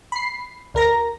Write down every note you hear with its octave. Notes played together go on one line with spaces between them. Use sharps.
B5 C7
D2 A#4 A#5 A#6